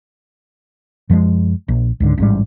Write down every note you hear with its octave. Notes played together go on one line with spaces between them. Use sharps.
F#2 F3 F#3 G#3
A#1
C#2 G#2 D3
A1 G#2 G3